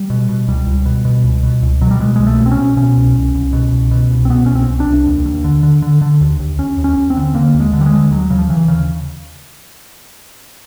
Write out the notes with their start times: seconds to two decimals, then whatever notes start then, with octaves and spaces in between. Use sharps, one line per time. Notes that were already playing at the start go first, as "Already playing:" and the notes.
Already playing: G3
0.10 B2
0.29 B2
0.48 C#2 G3
0.67 C#2
0.86 B2
1.05 B2
1.24 C#2
1.43 B2
1.63 C#2
1.81 B2 F#3
1.91 G3
2.00 B2 G#3
2.16 C2 G#3
2.26 A3
2.39 B2
2.46 C4
2.52 C#4
2.58 B2
2.77 B2 C#4
2.96 C2
3.15 C2
3.35 C2
3.53 B2
3.73 C2
3.91 B2
4.10 C2
4.25 C4
4.29 B2 B3
4.46 C2 C#4
4.55 C4
4.68 C2
4.80 D4
4.87 C2
5.06 D#2
5.25 D#2
5.44 D3
5.63 D3
5.82 D3
6.01 D3
6.21 D#2
6.40 D#2
6.59 D#2 C#4
6.78 D#2
6.84 C#4
6.97 D#2
7.10 C4
7.17 D3
7.35 D3 A#3
7.54 D#2
7.60 G#3
7.73 D3
7.81 G3
7.86 G#3
7.93 D3
8.11 D#2 F#3
8.30 C#3
8.38 F3
8.49 D#2 E3
8.68 C#3